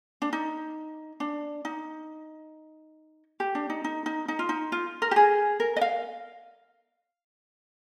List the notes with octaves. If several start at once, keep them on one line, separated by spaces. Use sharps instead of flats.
D4
D#4
D4
D#4
G4
D4
D#4
D#4
D#4
D#4
F4
D#4
F4
A#4
G4
G#4
A#4
D#5
F5